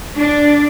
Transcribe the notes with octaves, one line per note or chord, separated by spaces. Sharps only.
D4